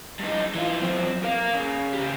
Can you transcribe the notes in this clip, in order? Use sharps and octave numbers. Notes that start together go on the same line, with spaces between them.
G2 D#4
E3 F4
F#2 C4
A#4 F5
C#3
C#3 G4